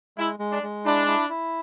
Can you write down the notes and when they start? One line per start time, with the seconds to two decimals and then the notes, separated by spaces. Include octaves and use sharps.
0.17 G#3 E4
0.39 G#3
0.52 D4
0.63 G#3
0.85 D4 E4
1.07 E4
1.29 E4